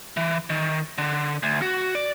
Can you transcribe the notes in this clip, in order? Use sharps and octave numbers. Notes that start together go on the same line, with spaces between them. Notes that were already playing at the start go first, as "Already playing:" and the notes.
E3
D#3
D3
D2
F#4
D5